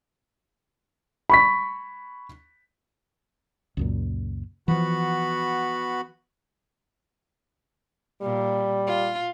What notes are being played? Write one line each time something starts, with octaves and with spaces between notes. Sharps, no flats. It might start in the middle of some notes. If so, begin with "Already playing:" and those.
B5 C#6 B6
C#2 F#2 A#2
E3 F3 B3 F#4 B5
A#2 G3
F4